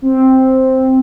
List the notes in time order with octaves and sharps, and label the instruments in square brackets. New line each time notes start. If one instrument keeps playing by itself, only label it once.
[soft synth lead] C4